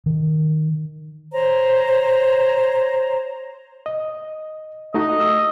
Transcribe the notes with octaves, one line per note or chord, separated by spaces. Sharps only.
D#3
C5 C#5 A#5
D#5
A3 D#4 F#4 D#5
D#6 E6